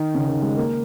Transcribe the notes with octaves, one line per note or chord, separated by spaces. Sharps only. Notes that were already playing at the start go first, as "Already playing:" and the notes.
Already playing: D#3
C#3
D#3
G#3
A#3